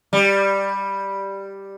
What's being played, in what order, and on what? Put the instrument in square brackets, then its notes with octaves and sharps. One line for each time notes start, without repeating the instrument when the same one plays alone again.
[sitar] G3